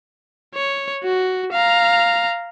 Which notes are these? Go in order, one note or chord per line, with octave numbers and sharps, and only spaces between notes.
C#5
F#4
F5 A#5